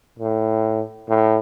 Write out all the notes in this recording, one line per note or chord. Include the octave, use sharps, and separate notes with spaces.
A2
A2